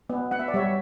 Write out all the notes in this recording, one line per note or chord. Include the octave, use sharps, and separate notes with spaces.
B3
B3 F#5
E5
D5
G3 C#5 E5